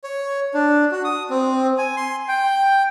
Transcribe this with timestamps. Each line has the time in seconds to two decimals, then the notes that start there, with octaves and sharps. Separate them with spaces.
0.04 C#5
0.54 D4
0.92 F#4
1.04 D#6
1.30 C4
1.78 G#5
1.97 C6
2.28 G5